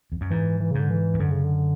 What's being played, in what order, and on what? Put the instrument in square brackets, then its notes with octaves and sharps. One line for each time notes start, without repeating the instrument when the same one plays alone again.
[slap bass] E2
F#2
[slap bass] G#2 [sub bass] E3
[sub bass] E3
[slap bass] G#2 [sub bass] C#3
[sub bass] D3
E3
[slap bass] E2
[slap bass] F#2 [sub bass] D3
[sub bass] C#3
D3